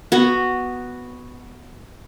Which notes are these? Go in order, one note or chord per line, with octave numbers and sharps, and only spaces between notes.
B3 F#4